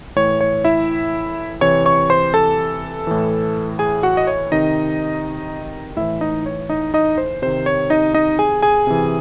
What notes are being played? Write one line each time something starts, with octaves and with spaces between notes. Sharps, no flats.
A2 E3 C#5
C#5
E4 E5
C3 E3 C#5 C#6
C#5 C#6
C5 C6
A4 A5
A2 E3
G#4 G#5
F#4 F#5
D#5
C#5
C3 D#3 D#4 D#5
A2 E3 E4 E5
D#4 D#5
C#5
D#4 D#5
D#4 D#5
C5
C3 D#3 C5
C#5
D#4 D#5
D#4 D#5
G#4 G#5
G#4 G#5
C3 E3